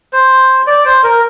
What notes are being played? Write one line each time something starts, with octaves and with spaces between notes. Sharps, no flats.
C5
D5
C5
A#4